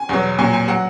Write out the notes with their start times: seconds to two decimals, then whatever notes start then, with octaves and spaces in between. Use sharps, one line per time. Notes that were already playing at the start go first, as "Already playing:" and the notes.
Already playing: G#5
0.09 E2 B2 F#3
0.39 A#2 F#3 G#5
0.53 G#5
0.68 F#3 F#5